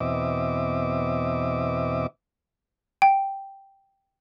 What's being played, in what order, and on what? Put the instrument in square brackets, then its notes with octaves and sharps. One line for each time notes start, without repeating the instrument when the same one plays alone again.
[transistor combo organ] E2 B2 C4 D#5 E5 D6
[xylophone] G5